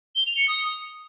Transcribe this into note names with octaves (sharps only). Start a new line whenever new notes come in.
G7
F7
C#7
D#6